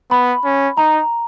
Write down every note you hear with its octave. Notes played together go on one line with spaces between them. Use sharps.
B3 B5
C#4
D#4 A#5